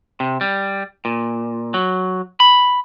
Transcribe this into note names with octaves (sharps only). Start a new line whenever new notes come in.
C3
G3
A#2
F#3
B5